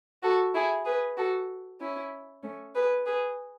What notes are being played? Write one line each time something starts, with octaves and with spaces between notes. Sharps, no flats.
F#4 A4
E4 G#4
G#4 B4
F#4 A4
C#4 E4
A3 C#4
G#4 B4
G#4 B4